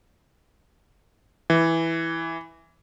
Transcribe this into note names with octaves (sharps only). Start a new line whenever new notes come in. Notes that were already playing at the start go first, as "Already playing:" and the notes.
E3